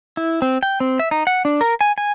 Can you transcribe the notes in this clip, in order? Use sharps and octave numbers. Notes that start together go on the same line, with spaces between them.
E4
C4
G5
C4
E5
D#4
F#5
D4
A#4
G#5
G#5